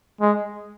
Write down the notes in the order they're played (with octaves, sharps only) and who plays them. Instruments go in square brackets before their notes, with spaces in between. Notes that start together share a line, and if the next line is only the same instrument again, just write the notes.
[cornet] G#3